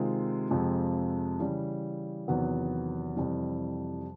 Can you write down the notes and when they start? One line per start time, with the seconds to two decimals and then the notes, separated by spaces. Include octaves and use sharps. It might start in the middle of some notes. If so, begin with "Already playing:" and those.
Already playing: C3 D#3 G#3 C4 F4
0.51 F2 C3 F3 G#3
1.39 C#3 E3 G3
2.28 E2 C3 D#3 F#3 B3
3.16 F2 C3 E3 G3